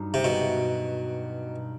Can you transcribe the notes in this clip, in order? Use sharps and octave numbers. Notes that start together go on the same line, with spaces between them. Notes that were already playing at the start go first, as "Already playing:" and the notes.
Already playing: G2 F#3 D#4
C3
B2